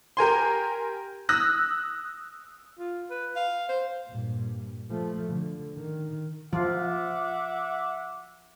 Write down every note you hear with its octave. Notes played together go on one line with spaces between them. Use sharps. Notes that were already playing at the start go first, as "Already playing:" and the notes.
G4 A#4 G#5 C6
D#6 E6 F#6 A#6
F4
B4
F5
C5
G2 A#2
F3 A3
D3
D#3
F3 F4 E5 F#5 D6